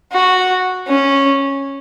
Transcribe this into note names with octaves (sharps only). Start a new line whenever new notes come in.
F#4
C#4